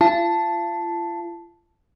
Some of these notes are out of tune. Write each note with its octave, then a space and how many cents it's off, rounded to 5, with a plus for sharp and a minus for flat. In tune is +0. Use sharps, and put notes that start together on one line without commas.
F4 -40 A5 +0